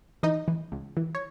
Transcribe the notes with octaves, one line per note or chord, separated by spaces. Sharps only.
E3 D#4 D#5
E3
C#2
E3
C#5